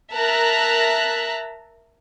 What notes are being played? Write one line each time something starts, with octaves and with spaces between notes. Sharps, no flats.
A#4 E5 A5 A#5 F#6